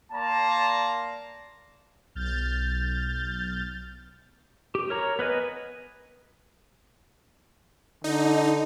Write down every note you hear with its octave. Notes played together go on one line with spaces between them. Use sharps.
A#3 D5 A5 A#5 C6
B1 F6 G6 A6
G4
A#4 C#5 A#5
B3 B4 D#5 G#5
D3 D#4